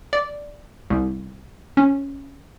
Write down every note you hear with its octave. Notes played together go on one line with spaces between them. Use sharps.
D5
C2
C#4